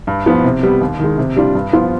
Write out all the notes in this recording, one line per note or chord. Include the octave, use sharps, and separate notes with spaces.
G2
F3 B3
C3
G3 B3
D#2
D#3 G#3
C3
G3 D4 F4
G2
F3 B3 F4